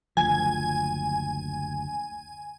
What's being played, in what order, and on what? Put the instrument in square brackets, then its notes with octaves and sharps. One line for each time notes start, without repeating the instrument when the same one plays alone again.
[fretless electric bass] F#1 D2 F3 [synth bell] G#5